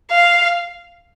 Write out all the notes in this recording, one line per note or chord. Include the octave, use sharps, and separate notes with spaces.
F5